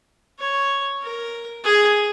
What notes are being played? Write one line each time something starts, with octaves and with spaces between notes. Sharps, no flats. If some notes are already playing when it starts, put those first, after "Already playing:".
C#5
A#4
G#4